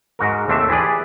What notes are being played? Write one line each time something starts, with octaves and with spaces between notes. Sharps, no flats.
G#2 F#4 A#4
D#2 A3 C4 D4 E5
E3 G4 G#4 B4 D5